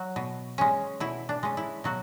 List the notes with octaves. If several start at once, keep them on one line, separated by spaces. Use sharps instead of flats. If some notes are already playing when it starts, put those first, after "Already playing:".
Already playing: F#3 F#4
B2
G#3 C#4
B2 E4
D4
G#3 C#4
E4
B2 F#3 F#4